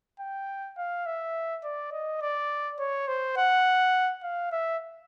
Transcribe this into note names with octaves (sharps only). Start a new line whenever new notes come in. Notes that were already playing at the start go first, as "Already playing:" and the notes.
G5
F5
E5
D5
D#5
D5
C#5
C5
F#5
F5
E5